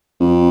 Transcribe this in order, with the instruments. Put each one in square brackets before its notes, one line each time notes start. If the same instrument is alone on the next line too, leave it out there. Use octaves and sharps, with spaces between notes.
[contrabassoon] F2